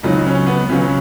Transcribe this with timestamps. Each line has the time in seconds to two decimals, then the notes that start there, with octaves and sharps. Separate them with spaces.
0.03 C#2 C#3 F#3 D#4
0.26 C#4
0.47 B3
0.69 C#2 C#3 F#3 C#4